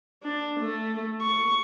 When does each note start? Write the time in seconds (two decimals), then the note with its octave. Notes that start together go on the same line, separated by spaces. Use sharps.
0.23 D4
0.60 A3
1.22 C#6